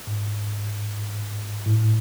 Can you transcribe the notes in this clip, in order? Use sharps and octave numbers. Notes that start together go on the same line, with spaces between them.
G#2
A2